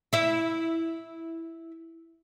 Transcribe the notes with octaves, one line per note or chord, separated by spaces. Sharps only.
E4 E5